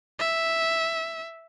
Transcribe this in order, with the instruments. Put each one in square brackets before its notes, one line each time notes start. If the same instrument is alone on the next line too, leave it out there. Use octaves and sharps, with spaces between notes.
[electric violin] E5